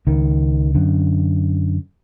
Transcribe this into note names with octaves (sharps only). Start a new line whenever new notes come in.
C#2 D#3
F#2 D3